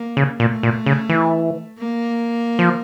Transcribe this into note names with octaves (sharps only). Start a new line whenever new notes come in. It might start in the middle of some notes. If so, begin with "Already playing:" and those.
Already playing: A#3
C#3
A#2 A3
A#2
C#3
E3
A#3
F3